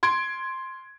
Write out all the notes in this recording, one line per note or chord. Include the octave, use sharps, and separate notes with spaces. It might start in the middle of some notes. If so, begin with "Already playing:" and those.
C6 G#6 D7